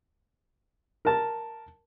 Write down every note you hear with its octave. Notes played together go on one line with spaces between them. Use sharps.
A#4 A5